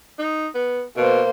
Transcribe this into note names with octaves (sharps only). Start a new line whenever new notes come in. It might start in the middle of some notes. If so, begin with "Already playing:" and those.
D#4
B3
B2 A#3 C5